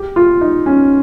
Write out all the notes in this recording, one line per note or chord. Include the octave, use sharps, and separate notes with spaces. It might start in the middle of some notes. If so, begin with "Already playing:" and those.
Already playing: G4
F4
D#4
C#4